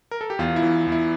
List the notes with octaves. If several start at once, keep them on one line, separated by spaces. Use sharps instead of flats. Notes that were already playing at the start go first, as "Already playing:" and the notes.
A#4
A4
G4
E2 F4
E4
E3
E2
E4